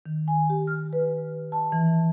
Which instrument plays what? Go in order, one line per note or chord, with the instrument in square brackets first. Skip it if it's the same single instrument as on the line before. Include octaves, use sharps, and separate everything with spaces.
[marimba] D#3
G#5
G4
F6
B4
A5
E3